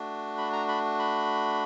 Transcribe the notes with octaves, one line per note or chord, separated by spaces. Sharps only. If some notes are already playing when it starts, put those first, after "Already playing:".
Already playing: A3 D4 F#4
B5
A#5
B5
B5